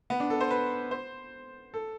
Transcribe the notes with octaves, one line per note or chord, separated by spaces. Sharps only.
B3
D4
A4
C5
B4
C5
A4